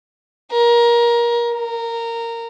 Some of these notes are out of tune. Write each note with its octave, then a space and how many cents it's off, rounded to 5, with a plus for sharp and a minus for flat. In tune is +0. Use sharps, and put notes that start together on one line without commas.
A#4 +20
A#4 -15